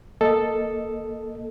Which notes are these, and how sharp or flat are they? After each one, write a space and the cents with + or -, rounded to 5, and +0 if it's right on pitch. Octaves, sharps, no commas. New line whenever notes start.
A#3 +0 A4 +0 D#5 +0